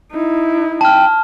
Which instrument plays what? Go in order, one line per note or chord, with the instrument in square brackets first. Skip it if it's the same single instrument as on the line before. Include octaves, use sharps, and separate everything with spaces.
[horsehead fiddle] D#4 E4
[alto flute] G5 [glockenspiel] A5 F6